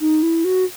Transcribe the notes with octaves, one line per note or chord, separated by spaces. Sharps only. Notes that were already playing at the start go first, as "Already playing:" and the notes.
D#4
E4
F#4